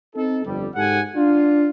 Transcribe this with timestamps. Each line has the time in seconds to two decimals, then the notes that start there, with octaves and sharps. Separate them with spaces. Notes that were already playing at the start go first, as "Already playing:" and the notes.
0.15 C4 D#4 A4
0.45 G1 F2 G3
0.75 G#2 G4 A4 F#5 G#5
1.15 D4 F4